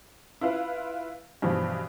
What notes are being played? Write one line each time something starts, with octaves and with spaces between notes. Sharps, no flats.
E4 F4 B4 F5
G2 B2 E3 F3